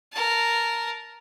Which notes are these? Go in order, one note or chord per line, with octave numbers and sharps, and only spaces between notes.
A#4 A5